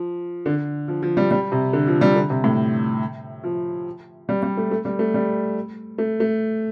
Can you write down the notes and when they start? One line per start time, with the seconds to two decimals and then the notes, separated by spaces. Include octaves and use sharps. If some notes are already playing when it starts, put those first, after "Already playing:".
Already playing: F3
0.46 D3
0.88 F3
1.02 F3
1.17 G3
1.31 G3
1.52 C3
1.73 D3
1.87 F3
2.01 G3
2.16 D3
2.30 C3
2.44 A2
3.44 F3
4.29 G3
4.43 G3
4.57 A3
4.71 A3
4.85 G3
4.99 A3
5.14 G3
5.98 A3
6.20 A3